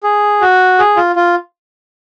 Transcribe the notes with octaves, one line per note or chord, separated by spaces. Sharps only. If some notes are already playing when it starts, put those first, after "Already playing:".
G#4
F#4
G#4
F4
F4